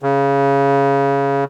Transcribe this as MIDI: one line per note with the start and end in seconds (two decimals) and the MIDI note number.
0.02 1.44 49